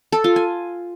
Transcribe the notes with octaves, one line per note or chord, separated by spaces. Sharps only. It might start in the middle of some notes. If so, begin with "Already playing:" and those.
A4
F4
G#5